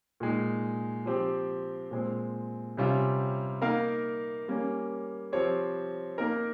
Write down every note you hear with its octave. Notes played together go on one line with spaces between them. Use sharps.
A#2 G#3 D#4
F3 C4 G4
A#2 G#3 C4
C3 G3 C#4 F4
A#3 D#4 A#4 F5
G3 A#3 C#4
F3 C4 G4 C#5
A#3 D#4 A#4